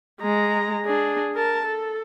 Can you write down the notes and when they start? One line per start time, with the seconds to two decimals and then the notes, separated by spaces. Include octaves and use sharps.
0.21 G#3 A#5
0.85 D4 G#4
1.35 A#4 A5
1.66 A4